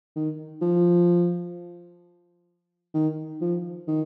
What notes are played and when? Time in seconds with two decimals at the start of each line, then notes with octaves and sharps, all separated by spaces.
0.16 D#3
0.62 F3
2.94 D#3
3.41 F3
3.88 D#3